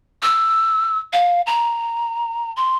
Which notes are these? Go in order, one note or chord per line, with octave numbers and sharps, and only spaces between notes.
E6
F5
A#5
C6